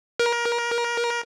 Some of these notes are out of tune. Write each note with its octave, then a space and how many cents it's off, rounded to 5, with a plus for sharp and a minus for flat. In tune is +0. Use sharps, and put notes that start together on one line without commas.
A#4 +25